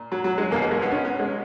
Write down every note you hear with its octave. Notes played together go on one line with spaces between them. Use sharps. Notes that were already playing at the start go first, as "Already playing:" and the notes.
Already playing: A#2
F#3
F#3
G#3
E2 B2 A#3
B3
G#3
B3
C#4
B3
G#3